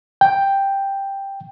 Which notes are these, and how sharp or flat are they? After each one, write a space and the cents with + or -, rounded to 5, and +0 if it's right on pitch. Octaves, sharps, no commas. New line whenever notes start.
G5 +5